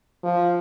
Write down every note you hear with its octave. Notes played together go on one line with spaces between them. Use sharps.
F3